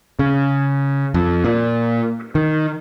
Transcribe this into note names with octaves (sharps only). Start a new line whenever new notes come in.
C#3
F2
A#2
D#3